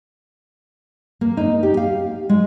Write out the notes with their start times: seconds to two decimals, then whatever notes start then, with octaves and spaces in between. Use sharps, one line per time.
1.21 A#3
1.37 D#4
1.63 G4
1.77 F5
2.29 G#3